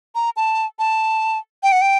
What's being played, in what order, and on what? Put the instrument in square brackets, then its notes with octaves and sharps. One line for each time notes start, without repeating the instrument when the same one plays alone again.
[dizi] A#5
A5
A5
G5
F#5
G5